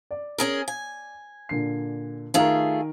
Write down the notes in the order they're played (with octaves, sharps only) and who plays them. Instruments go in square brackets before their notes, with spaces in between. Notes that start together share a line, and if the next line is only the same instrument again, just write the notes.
[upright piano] D5
[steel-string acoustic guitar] C#4 G#4 A#4
G#5
[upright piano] A#2 D3 C7
[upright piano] D#3 D#4 A#4 [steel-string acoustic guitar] A3 F4 G#4